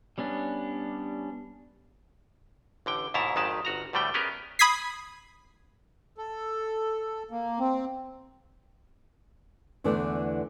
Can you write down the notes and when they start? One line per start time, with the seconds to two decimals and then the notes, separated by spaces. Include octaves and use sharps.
0.18 G3 B3 C#4 D4
2.86 A1 D3 G5
3.14 D#2 G#2 B2 E4 A5 A#5
3.36 G#1 F2 D#3 G#3 G4 A5
3.65 G1 F#4 A#5
3.93 D2 A2 G3 A3 G5
4.14 B3 C#4 G4 G#4 A#4
4.59 B5 D#6 G#6 B6 C7
6.18 A4
7.31 A#3
7.59 C4
9.84 E2 D3 E3 A3 D5